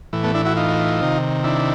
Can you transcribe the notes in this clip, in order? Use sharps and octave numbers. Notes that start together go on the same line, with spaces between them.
A2 E3
A3 B3
D4 E4
E4 F#4
D#4 F4
C3 D#3
D4 E4